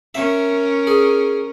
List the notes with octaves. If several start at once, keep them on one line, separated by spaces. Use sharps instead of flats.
C#4 A#4 E5
G#4